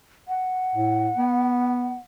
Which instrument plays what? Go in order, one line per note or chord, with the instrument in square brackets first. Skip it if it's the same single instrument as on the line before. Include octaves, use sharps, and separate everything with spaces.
[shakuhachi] F#5
[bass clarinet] A2
B3